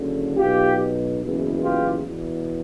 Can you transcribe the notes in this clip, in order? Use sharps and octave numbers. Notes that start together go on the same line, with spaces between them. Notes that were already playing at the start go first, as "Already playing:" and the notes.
Already playing: F#1 F#2 D3
B1 B2 F4 G4
F#1 E2 B2
F4 G4
E2 B2